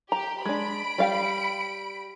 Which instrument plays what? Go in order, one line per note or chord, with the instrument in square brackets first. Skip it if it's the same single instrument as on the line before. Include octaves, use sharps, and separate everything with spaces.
[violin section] G4 [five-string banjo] A#5
[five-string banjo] G#3 D4 [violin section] B5 D7
[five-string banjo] G3 F5 G5